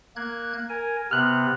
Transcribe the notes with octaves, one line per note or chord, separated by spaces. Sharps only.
A#3 F#6 G#6
A#4 G#5
C3 B3 F6 F#6